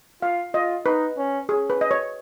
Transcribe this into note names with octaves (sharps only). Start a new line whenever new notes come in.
F4 F5
F4 D#5
D#4 B4
C#4
C#4 G#4
B4
D#5
C#5